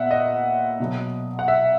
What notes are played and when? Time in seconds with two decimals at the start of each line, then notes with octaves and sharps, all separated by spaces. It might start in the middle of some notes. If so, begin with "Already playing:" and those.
Already playing: A#2 B3 E5 F#5
0.11 D#5
0.80 B2 F#3 B3
1.39 F#5
1.48 E5